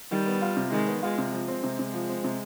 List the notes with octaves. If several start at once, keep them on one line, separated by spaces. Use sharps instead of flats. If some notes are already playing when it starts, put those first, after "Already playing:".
D#3 G3
B3
F4
C3
D#3 G#3
B3
G#3 F4
C3
F3 G#3
C4
C3
C3
F3
C4
C3